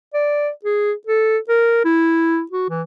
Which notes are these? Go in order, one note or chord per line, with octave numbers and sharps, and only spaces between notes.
D5
G#4
A4
A#4
E4
F#4
E3